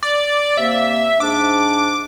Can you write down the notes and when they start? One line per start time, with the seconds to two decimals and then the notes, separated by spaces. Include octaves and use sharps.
0.03 D5
0.57 C3 A#3 E5
1.20 G#2 D4 D6